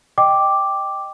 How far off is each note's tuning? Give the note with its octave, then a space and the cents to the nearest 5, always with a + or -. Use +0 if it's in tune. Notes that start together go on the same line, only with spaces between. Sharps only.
D#5 -15 G5 +0 D6 +0